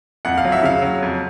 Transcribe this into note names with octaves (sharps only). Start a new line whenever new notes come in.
F2 F#5
F5
F#3
E5
C#3 F5
F#3
F2